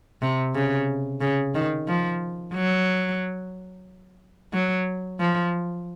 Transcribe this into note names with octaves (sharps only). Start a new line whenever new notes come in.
C3
C#3
C#3
D#3
F3
F#3
F#3
F3